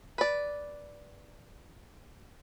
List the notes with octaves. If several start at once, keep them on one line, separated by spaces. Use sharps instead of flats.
B4 D5